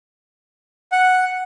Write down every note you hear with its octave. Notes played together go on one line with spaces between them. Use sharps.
F#5